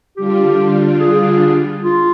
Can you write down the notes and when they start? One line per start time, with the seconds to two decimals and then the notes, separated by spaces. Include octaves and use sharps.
0.17 D3 G3 D4 F4 G4
1.00 G#4
1.84 F4